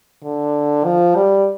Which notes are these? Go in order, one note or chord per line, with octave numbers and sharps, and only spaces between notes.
D3
F3
G3